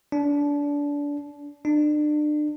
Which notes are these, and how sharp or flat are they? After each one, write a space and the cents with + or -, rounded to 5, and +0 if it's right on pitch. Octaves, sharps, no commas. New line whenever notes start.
D4 -25
D4 +35